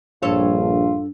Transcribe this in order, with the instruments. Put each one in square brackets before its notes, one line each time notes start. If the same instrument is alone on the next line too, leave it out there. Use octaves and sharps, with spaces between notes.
[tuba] A#1 [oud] G2 A4 C#5 [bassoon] F4